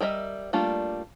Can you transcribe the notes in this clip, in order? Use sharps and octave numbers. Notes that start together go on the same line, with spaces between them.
G3 A#4 D#5 E5
G3 A3 A#3 D4 F4